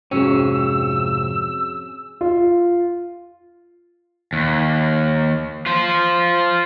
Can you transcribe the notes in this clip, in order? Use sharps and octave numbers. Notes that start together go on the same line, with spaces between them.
F2 G#2 C3 C4 C#4 F#4 G#4 E6
F4
D#2
F4 C5